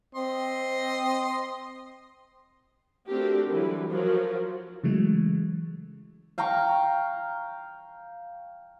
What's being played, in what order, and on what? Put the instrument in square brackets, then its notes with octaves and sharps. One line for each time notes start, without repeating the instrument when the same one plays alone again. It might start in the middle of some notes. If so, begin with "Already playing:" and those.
[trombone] C4 [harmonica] D#5 C6
[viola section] A3 C4 D4 F#4 G4 A#4
D3 E3 F#3 G3 A4 B4
F3 F#3 F4 F#4 A#4
[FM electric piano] C#3 E3 F#3 G#3 A3
[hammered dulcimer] F5 G5 A#5 C#6